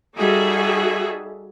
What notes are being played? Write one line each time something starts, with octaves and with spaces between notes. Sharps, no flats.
G3 D#4 F#4 G#4 A4 E5